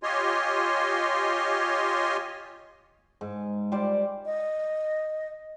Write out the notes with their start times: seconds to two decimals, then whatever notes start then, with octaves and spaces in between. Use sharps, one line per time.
0.03 F4 G4 C#5 D#5 G#5 C6
3.21 G#2
3.72 G3 G4 C5 D5
4.26 D#5